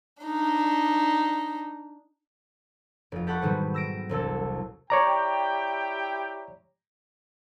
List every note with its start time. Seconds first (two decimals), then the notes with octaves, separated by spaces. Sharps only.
0.23 D4 D#4
3.12 F1 F4
3.27 G4 A4 F#5 B5 C#6
3.42 G#2 B2 D#3 F#3 G3
3.74 E6 A#6 D7
4.09 E1 C2 A4 E6
4.90 E4 G4 C#5 D5 G5 A#5